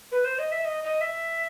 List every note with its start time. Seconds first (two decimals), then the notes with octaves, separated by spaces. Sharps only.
0.12 B4
0.25 C5
0.38 D#5
0.52 E5
0.65 D#5
0.84 D#5
1.01 E5